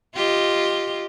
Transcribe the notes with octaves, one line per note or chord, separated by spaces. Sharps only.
F4 G4 D#5